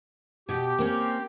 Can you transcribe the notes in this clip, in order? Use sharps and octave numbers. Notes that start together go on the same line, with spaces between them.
B2 G4
A#3 C4 C#4